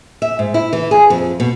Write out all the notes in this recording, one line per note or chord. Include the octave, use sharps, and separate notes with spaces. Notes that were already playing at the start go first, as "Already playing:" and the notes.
E5
G#2
E4
E3
G#4
F2
B2